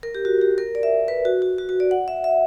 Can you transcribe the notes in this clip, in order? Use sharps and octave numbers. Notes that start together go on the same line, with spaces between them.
A#4
G4
F#4
G4
A#4
D5
E5
B4
F#4
F#4
F#4
F#4
D5
F#5
E5
E5